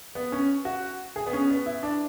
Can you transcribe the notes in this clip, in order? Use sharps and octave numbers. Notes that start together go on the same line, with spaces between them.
B3
C#4
F#4
G#4
B3
C#4
B3
E4
D4